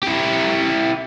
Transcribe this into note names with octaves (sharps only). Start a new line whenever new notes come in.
E4 G4